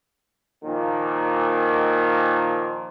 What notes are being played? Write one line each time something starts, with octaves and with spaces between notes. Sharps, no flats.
A#2 D#3 F3 A#3